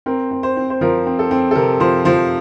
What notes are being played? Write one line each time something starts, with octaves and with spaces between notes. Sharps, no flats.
C4 A#4
C4
C5
C4
C5
F3 A#4
C4
A4
C4
A4
C3 A#4
F3 C5
F3 C5